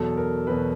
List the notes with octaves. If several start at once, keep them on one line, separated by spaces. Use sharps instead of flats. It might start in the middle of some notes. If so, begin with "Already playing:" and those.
Already playing: E2 B2 F#3 A4
A#4
E2 B2 F#3 B4